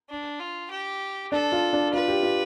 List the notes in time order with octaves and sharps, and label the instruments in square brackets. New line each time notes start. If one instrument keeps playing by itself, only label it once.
[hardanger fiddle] D4
F4
G4
[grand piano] D4 [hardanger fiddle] A4
[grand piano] F4
D4
[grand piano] F4 [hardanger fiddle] B4
[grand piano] G4
F4